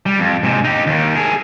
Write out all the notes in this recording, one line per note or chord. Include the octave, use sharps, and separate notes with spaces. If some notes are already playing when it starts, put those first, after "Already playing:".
G3
F2
G#2 C3
D#4 G4
D#2 D#3
G#4 A#4